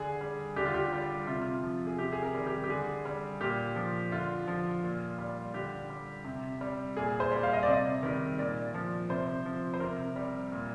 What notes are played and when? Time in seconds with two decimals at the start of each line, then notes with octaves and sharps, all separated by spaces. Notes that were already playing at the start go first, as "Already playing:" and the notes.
Already playing: D3 G#4
0.21 G3
0.56 D3 G4
0.65 F4
0.74 G4
0.93 G3
1.27 C3 F4
1.42 F4
1.63 F3
1.87 G#4
1.99 C3 G4
2.12 G#4
2.23 A#4
2.35 D#3 G3
2.47 G4
2.64 G4
2.69 D3 G#4
3.05 G3
3.41 A#2 G4
3.76 F3
4.12 D3 F4
4.48 F3
4.83 A#2
5.19 G3
5.54 D3 G4
5.90 G3
6.25 C3
6.61 G3
6.97 A#2 G#4
7.20 C5
7.31 G3
7.43 F5
7.53 D#5
7.63 D5
7.67 C3
7.73 D#5
8.03 D#3 G3
8.39 A#2 D5
8.74 F3
9.10 C3 C5
9.46 F3
9.74 C5
9.80 C3 A#4
10.16 G3
10.52 A#2